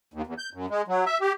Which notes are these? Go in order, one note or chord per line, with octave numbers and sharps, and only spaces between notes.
D#2
E2
G6
F#2
G#3
F#3
E5
G4